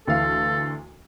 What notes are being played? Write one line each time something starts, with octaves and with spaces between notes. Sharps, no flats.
D2 E3 A4 F5